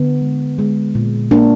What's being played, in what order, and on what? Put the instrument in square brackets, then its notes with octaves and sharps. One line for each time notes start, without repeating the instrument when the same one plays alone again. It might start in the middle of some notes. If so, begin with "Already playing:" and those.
Already playing: [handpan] D3 B3
G#3
G#3
A#2
A#3 D4